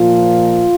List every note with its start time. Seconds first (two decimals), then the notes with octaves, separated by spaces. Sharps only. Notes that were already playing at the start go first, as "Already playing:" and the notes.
Already playing: A#2 F3 F4